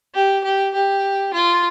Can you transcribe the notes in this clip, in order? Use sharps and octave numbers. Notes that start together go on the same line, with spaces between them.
G4
G4
G4
F4